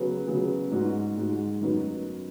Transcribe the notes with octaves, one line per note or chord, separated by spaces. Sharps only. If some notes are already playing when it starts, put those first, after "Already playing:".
Already playing: C#3 F#3 B3 G#4
C#3 F#3 B3 G#4
G#2 G#3 D#4 F#4
G#2 G#3 D#4 F#4
F#2 F#3 B3 D#4 F#4